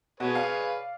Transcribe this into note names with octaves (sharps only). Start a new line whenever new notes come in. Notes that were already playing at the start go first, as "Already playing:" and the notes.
B2 F#4 G#4 B4 C#5
D5 F5